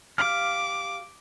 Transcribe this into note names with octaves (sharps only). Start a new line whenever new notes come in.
G4 F5 D6 F6